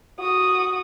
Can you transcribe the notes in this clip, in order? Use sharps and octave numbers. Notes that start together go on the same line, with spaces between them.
F#4 D#6